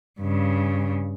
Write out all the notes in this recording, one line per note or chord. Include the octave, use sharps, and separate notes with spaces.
G2 C#3